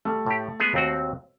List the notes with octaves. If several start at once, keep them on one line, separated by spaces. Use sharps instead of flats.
G3 A3
A2 G4
G#3 B3 G#4
D#2 C4 F#4